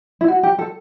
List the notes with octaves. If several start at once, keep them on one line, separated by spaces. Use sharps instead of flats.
E4
F#4
G4
A4